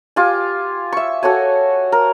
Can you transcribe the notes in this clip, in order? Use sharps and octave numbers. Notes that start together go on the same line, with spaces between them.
F4 G4 G#5
E5 C#6
F#4 A4 C#5 G#5
A#4